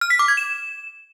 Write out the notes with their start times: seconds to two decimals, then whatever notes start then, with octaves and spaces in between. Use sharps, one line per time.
0.01 F6
0.10 B6
0.19 D6
0.28 G#6
0.37 E7